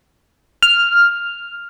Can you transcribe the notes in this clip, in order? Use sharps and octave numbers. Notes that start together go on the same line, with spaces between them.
F6